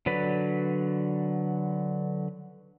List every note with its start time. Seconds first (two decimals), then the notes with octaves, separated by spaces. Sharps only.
0.06 D3 F#3 B4 D5 B5